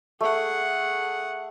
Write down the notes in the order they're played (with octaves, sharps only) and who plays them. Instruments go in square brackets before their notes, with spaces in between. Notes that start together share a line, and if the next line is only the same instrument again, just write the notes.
[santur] A3 [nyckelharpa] G#4 F#5